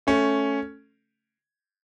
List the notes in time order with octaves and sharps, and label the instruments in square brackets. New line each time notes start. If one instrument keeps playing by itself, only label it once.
[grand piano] A3 C#4